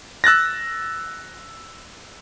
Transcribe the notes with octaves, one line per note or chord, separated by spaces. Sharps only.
E6 F#6 A6 A#6